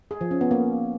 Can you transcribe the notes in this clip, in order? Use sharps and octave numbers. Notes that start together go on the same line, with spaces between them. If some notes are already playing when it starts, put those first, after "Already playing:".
G#4
F3
C#4
B3
A#3